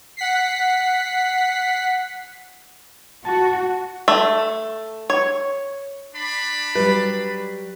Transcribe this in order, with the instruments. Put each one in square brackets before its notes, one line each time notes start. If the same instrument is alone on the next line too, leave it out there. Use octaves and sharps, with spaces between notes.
[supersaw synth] F#5 B6 C7
[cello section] F#4 [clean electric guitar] A5
[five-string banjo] A3
C#5
[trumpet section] D4 D5 B5
[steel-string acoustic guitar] F#3 G3 [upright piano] B4